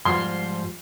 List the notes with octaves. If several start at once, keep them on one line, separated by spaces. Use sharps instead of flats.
G#2 F3 G3 C6